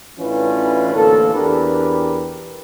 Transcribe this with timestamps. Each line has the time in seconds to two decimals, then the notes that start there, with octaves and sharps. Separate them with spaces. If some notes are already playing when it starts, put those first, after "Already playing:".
0.19 A1 E3 C#4 D4 F4 B4
0.94 A1 D2 A2 A#3 A4
1.34 E2 D4 G4 A#4 B4